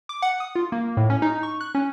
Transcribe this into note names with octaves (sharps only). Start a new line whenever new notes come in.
D6
F#5
D#6
F4
A#3
A2
C#4
D#4
C#6
F#6
C#4